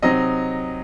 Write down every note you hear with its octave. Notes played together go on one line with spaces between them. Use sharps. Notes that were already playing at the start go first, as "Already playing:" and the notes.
C3 F#3 C4 D#4 D#5